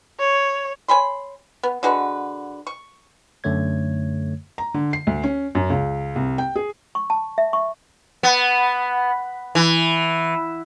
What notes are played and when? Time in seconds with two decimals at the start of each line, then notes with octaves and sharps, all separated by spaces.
0.20 C#5
0.88 C#5 G#5 B5 C6
1.63 B3
1.83 D3 G#3 F#4 B4
2.67 C#6
3.44 F#2 D3 A3 C#5 G#6
4.58 A#5
4.74 D3
4.93 C7
5.07 D2
5.24 C#4
5.55 F#2
5.70 C#2
6.16 C2
6.38 G5
6.56 G#4
6.95 C#6
7.10 A5
7.38 E5
7.53 C#6
8.23 B3
9.55 E3